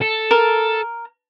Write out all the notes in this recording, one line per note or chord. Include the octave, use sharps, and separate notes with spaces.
A4
A#4